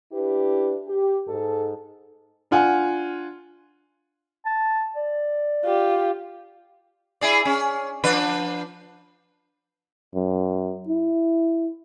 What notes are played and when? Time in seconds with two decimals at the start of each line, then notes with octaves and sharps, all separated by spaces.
0.12 D4 E4 G4 B4
0.87 G4
1.26 G#2 A4
2.51 D4 F4 F#5 G#5
4.46 A5
4.96 D5
5.64 F4 G4
7.21 E4 G#4 D5
7.45 C#4
8.04 F3 D4 B4
10.15 F#2
10.88 E4